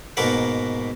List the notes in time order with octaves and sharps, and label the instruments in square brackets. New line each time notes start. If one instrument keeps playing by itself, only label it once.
[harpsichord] G#2 B2 A#3 A#4 B4 F#5